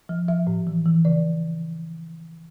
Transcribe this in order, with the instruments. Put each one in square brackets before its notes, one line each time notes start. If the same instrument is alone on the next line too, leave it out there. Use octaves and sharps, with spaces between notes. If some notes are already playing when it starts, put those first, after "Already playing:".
[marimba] F3
F3 E5
A2
E3
E3
C#3 D5